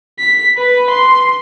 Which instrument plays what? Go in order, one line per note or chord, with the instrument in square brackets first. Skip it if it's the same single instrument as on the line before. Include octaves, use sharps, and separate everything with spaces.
[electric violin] B6
B4
C6